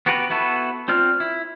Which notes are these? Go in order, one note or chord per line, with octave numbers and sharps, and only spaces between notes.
B3 F#4 G4 A#4 B4
B3 E4 F#4 A4 B4
C4 F4 D5 F6
E4